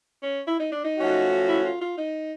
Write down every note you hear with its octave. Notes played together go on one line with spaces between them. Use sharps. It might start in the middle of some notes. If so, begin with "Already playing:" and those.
C#4
E4
D#4
D4
D#4
F3 A3 C#4 F#4
E4
F4
F4
D#4